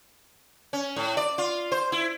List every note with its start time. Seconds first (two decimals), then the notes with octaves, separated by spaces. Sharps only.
0.73 C#4
0.96 A2
1.17 D5
1.38 F4
1.72 C5
1.92 E4